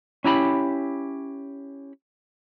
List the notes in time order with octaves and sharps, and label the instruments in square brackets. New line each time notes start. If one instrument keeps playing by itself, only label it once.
[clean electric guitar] C#4 E4 G4 A#5 B5